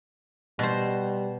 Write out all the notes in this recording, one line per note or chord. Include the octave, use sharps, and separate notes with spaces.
B2 G3 C5